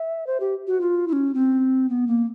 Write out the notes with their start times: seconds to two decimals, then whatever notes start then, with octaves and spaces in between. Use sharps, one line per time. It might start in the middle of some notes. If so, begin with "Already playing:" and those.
Already playing: E5
0.27 C5
0.40 G4
0.67 F#4
0.81 F4
1.08 E4
1.13 C#4
1.34 C4
1.89 B3
2.07 A#3